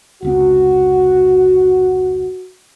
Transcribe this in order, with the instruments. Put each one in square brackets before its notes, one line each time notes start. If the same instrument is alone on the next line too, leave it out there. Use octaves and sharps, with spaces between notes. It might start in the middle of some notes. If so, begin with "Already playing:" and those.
[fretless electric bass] F1 C#2 C4 [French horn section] F#4